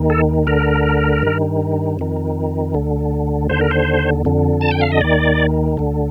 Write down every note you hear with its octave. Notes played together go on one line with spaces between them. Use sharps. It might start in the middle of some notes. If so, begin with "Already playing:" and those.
Already playing: D#2 D#3
A4
D2 D3 A#4
G2 D#3
F2 D#3
D2 D3
D#2 D3 C5
A#4
C5
F2 D3
A5
G5
F5
D#5
D#2 D#3 D5
D2 D3